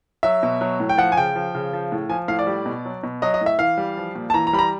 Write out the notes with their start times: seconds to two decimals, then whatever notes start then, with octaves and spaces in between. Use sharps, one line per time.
0.23 F#3 E5
0.43 B2
0.61 F#3
0.80 A2
0.89 G5
0.98 F3 F#5
1.12 G#5
1.17 C#3 G5
1.36 F3
1.55 C#3
1.73 F3
1.92 A2
2.10 F3 G#5
2.28 A2 F5
2.39 D5
2.47 G3
2.66 B2
2.85 F#3
3.03 B2
3.22 F#3 D#5
3.34 D#5
3.41 A2
3.46 E5
3.59 E3 F5
3.78 G3
3.97 F3
4.15 A#2
4.30 A5
4.34 E3 A#5
4.47 A#5
4.53 G3 B5
4.59 A#5